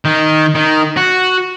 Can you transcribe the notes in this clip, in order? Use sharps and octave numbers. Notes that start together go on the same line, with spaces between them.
D#3
D#3
F#4